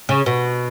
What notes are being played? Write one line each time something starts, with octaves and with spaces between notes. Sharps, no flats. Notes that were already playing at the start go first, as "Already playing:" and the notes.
C#3
B2